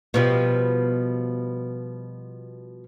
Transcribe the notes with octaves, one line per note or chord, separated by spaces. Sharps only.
B2 F3 G3